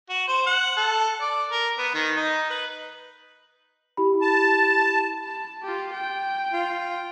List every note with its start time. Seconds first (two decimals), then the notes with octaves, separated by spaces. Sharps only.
0.10 F#4
0.28 C5
0.46 F#5
0.77 A4
1.21 D5
1.50 A#4
1.78 B3
1.94 D#3
2.17 D#4
2.50 B4
3.97 E4 G4 B5
4.21 A5
5.25 A5
5.63 F4 G4
5.93 G5
6.53 F4